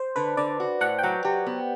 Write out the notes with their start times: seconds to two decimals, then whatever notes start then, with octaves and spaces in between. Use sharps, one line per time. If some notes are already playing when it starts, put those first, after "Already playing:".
Already playing: C5
0.16 D3 B4
0.37 D3 D5
0.60 F#4
0.81 A2 F#5
0.99 G5
1.03 F#3 F#5
1.25 F#3 G4
1.46 B3